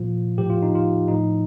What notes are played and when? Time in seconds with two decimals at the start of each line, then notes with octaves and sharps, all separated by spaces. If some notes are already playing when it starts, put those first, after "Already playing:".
Already playing: A#2 F3 F4
0.38 A2 F3 G4
0.50 F4
0.62 D#4
0.75 F4
1.08 A2 F3 D#4